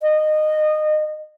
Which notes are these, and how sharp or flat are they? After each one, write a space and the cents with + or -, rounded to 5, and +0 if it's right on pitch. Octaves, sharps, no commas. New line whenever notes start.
D#5 -20